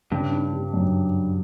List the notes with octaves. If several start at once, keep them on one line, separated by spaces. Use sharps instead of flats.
G2 C#3
D4
G3
F#2